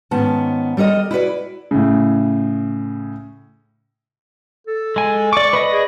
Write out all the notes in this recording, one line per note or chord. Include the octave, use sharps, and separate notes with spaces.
G#2 D#3 B3 C#4 A5
G3 A4 A#4 D#5
E4 F#4 B4 D5
A2 C#3
A4
G#3 G#5
D5 C#6 D6
B4 D5 D#5
G#4